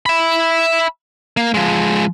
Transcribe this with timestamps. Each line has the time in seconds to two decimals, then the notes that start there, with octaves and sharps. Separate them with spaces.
0.06 E5 B5
1.37 A#3
1.54 F3 G#3